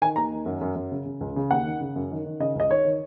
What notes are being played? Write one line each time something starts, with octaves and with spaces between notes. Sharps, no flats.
D#3 G#5
D#2 A#5
D#3
F#2
F#2
F#2
C#3
C#3
C#2
C#3
D#2 F#5
D#3
C#3
F#2
D#3
D#3
C#3 D#5
C#2 D#5
D#3 C#5
D#3